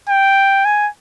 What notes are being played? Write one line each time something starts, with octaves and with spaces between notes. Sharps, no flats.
G5
G#5